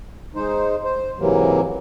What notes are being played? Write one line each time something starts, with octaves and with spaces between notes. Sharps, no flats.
G#3 D#4 C5
C5
G#2 C3 E3 F#3 A#3